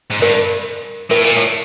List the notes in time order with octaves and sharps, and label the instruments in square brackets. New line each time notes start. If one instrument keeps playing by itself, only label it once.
[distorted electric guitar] G#2
[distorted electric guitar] G2 [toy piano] A#4
[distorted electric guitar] A2 [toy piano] A#4
[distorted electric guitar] A#2
A2